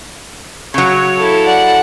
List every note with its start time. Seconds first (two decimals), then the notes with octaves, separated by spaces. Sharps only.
0.74 C#3 F#3 C#5
1.16 E4 A4
1.46 D5 F#5